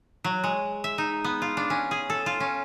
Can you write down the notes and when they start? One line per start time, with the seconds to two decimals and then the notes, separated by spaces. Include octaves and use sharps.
0.24 F#3
0.44 G#3
0.84 E5
0.98 D#4
1.24 B3
1.42 F4
1.57 D4
1.70 C#4
1.91 G#4
2.10 A4
2.26 F4
2.40 C#4